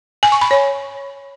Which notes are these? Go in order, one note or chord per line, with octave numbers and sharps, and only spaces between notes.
G#5
C#6
B5
C#5